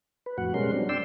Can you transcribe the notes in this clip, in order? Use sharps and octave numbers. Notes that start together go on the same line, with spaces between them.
B4
F2 A2 F#4 F#5
B2 G3 G#3 C#4 A#4 C6
F#3 C4 D4
D5 G5 C6 E6